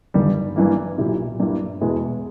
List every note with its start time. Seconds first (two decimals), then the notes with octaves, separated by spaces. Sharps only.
0.14 G1 G2 D#3 G3
0.56 G2 E3 A#3
0.98 B1 A#2 A#3 E4 G4
1.40 G2 G3 A#3 E4
1.81 E2 B2 G#3 B3 E4